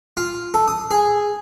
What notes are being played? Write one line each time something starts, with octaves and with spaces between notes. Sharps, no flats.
F4
A4
D#6
G#4